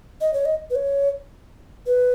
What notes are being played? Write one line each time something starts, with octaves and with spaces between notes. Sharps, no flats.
D#5
C#5
D#5
B4
C#5
B4